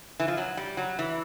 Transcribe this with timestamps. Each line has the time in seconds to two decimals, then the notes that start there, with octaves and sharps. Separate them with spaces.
0.20 E3
0.28 F3
0.37 F#3
0.57 G3
0.77 F#3
0.99 E3